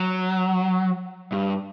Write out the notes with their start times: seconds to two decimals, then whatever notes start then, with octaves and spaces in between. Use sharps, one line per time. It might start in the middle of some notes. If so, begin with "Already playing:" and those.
Already playing: F#3
1.32 G2